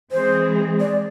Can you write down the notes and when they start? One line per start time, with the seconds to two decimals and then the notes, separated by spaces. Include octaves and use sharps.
0.11 E3 G#3 C4 G#4 C5
0.80 D5